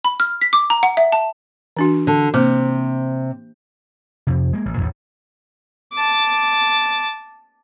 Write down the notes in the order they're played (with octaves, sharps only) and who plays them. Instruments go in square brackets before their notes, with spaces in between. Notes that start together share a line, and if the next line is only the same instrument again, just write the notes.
[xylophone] B5
F6
B6
D6
A#5
F#5
E5
A5
[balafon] E3 D4 F#4
[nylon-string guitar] D3
[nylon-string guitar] C3 [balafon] A#3 C5 D6
[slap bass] F2 C3
G#3 A#3
A1
A1 E2 A#2
[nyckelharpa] A5 D6